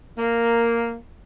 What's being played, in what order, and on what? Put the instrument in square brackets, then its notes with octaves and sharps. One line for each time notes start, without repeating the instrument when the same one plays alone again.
[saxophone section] A#3